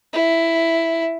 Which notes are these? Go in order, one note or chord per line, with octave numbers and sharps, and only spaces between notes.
E4